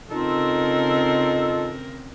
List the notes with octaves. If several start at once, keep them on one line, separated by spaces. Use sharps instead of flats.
C#3 C4 D#4 F4 A4 A#4